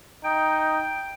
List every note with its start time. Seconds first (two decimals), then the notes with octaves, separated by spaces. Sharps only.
0.25 D#4 G5